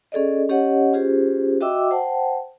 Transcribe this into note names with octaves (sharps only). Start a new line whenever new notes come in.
C#4 G#4 A4 D5 D#5
C#4 G4 C#5 D#5 F#5
C#4 F4 G4 G#4 C5
F#4 D#5 E5 G5 D6 E6
C5 F#5 G5 A5